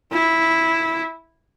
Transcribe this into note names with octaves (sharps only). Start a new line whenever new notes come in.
E4